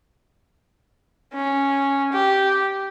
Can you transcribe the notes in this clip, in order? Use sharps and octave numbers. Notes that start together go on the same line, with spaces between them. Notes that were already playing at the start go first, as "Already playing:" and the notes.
C#4
G4